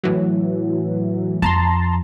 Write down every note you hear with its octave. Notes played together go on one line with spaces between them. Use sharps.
A2 E3 F#3
F2 A5 A#5 C6